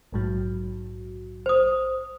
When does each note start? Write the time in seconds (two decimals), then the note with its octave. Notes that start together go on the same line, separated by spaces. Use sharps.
0.13 A#1 G#2 F#3
1.46 C5 D#6